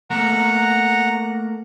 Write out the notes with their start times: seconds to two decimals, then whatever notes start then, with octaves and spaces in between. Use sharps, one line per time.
0.10 A3 A#3 A#4 F#5 A#5